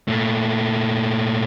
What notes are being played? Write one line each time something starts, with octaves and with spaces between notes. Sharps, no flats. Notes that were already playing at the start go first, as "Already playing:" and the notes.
A#2 A3